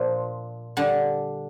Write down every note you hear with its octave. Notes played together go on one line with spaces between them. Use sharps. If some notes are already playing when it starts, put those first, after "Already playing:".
Already playing: A#2 F3 D4 F4
D3 G3 D4